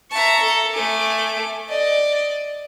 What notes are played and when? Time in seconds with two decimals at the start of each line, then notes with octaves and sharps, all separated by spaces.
0.11 E5 A5 A#5 C#6
0.41 A4
0.74 A3 G#5 D6
1.69 D5 D#5